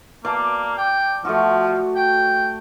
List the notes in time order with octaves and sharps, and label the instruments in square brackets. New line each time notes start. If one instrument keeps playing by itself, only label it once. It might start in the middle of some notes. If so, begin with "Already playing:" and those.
[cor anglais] A#3 [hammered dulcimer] D5 F5 A5
[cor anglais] G5
[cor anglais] F3 [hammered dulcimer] A3 F#4
[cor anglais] G5